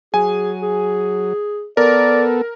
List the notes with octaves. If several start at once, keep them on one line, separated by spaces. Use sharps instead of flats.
F#3 G#4 G#5
G#4
B3 A4 A#4 D5